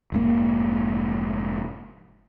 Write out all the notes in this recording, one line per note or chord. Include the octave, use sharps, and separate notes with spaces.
F1 G#2 A#3